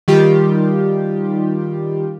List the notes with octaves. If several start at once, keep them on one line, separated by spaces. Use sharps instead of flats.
D#3 G3 F4 G4